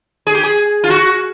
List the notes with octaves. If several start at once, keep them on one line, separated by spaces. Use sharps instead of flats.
G#4
G4
G#4
F4
F#4